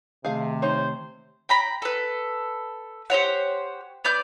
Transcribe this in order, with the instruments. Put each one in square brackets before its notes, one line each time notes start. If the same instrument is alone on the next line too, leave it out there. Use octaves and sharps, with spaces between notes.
[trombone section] C3 [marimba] D#3 A3 [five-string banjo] G#4 F5
[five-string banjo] D#4 C#5 [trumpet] C5
[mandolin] G5 A#5 B5
A4 B4
G4 C5 C#5 F#5
B3 D5 D6 G6